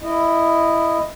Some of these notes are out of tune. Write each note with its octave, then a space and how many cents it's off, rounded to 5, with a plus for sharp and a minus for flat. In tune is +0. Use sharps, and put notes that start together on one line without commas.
E4 +5 D#5 -10